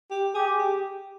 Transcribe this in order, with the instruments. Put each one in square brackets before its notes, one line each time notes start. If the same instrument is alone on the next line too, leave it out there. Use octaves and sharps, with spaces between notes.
[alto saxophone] G4
[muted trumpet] G4 [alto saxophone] G#4
[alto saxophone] G4